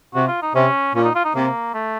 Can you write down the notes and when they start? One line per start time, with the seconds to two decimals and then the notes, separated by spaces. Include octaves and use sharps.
0.14 C3 F#4
0.28 F4
0.42 D#4
0.54 C3 C#4
0.95 A#2 C#4
1.04 D#4
1.15 F4
1.24 D#4
1.35 C3 A#3
1.74 A3